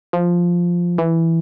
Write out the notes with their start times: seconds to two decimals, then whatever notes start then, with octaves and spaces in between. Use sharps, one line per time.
0.13 F3
0.98 E3